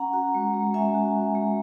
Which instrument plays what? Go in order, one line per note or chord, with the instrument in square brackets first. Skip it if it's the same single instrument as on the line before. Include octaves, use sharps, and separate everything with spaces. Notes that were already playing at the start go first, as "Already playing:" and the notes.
Already playing: [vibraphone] C#4 F#5 A#5
F#4
G#3
G#3
C#4 E5 G#5
F#4
G#3
G#3